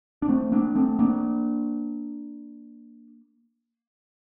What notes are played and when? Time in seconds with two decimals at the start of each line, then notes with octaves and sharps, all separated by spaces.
0.22 D4
0.29 A3 C4
0.52 A#3 D4
0.75 A3 C4
0.99 A#3 D4